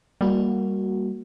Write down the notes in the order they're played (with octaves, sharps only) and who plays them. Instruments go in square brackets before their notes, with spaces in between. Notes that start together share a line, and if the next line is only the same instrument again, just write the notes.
[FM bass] G3 [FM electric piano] A#3 F#4